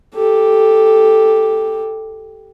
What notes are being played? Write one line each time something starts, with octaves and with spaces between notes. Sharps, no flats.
G4 A4